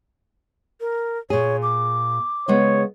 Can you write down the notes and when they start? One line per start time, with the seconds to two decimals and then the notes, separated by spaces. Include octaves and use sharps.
0.81 A#4
1.30 A#2 G#4 C#5
1.62 D6
2.48 C#3 G#3 B3 C#5